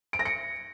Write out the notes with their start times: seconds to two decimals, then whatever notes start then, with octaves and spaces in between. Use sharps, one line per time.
0.13 D7
0.19 A#6
0.25 C#7